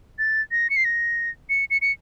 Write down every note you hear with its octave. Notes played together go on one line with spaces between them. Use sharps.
A6
A#6
C#7
C7
A#6
C#7
C#7
C#7